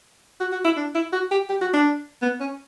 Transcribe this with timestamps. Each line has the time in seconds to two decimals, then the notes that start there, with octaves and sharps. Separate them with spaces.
0.40 F#4
0.52 F#4
0.65 E4
0.77 D4
0.95 E4
1.13 F#4
1.31 G4
1.49 G4
1.61 F#4
1.73 D4
2.22 B3
2.40 C#4